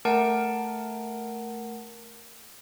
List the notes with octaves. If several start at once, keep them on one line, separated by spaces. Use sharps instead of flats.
A3 A#4 F#5 A5 D7